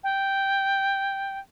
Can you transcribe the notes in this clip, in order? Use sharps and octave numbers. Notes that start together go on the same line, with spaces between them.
G5